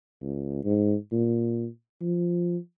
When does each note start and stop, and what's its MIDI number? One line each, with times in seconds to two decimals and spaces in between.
0.22 0.60 37
0.65 0.95 44
1.12 1.67 46
2.01 2.57 53